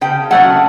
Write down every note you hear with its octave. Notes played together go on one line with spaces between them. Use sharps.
C#3 G5
F#3 A3 C#4 F#5